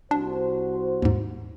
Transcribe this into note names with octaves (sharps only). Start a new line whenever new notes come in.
C2 D4 F#4 C5
D#2 G#2